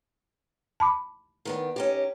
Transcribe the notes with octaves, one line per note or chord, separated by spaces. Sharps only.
A5 B5 D6
D#3 B3 D4
C#4 D#4 G4